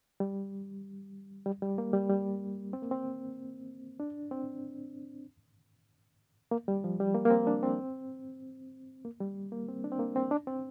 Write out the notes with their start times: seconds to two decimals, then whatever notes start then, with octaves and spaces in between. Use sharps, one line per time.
0.20 G3
1.46 G3
1.62 G3
1.78 A#3
1.93 G3
2.10 G3
2.73 C4
2.82 A#3
2.91 C4
4.00 D4
4.31 C4
6.51 A#3
6.68 G3
6.84 F3
7.00 G3
7.15 A#3
7.25 A#3
7.30 C4
7.47 D4
7.63 C4
9.05 A#3
9.21 G3
9.52 A#3
9.68 C4
9.84 D4
9.92 C4
9.99 A#3
10.16 C4
10.31 D4
10.47 C4